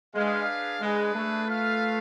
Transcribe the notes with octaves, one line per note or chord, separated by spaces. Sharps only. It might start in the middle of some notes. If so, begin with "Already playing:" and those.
G#3 D4 G#4 B4 F5
G#3 D4 G#4 B4
A3
F4 B4 F5